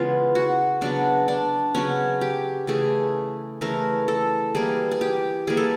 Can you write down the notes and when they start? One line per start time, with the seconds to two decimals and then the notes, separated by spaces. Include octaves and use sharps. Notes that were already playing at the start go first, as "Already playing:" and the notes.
Already playing: C#3 E3 G#3 B3 F4
0.35 F#4
0.81 C#3 F#3 B3 D4
1.28 D4
1.75 C#3 F#3 B3 C#4
2.21 G4
2.67 C#3 E3 A3 G#4
3.61 C#3 E3 A3 A#4
4.08 A4
4.54 E3 G3 A#3 G#4
4.91 G#4
5.01 G4
5.47 E3 G3 A#3 G#4
5.57 A4